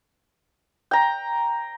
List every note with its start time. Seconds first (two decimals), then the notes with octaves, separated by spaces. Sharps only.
0.91 G5 A#5